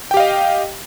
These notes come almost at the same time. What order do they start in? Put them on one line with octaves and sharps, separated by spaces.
G5 G4 F5 D#5